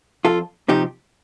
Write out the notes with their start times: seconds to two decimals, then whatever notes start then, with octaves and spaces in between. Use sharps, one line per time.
0.25 F2 F4 A4
0.68 C3 F3 D#4 G4